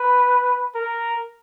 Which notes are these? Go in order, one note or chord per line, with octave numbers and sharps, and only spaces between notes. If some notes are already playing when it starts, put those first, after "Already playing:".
Already playing: B4
A#4